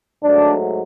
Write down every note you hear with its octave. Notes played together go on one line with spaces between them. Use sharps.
G#2 F#3 A3 D4